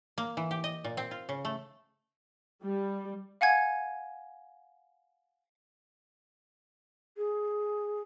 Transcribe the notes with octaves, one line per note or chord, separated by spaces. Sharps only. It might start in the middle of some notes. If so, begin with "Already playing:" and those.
A#3
E3
G4
D#5
A#2
C4
F4
C#3
A3
G3
F5 F#5 G#5 G#6
G#4